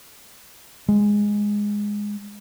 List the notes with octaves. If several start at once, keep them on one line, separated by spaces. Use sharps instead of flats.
G#3